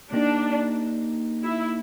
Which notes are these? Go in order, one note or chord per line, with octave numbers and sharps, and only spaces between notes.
A#3 D4 D#4 G4
E4